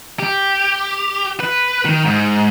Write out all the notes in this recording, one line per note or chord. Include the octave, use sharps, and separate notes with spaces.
G4
B4
D#3
G#2